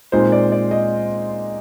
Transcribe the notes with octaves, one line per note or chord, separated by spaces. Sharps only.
A#2 G#3 C4 D#4 C5
D5
D5
D#5